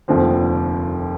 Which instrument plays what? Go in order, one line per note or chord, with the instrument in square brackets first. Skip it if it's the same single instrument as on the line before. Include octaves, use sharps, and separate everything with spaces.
[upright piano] F1 D#2 D3 F3 C4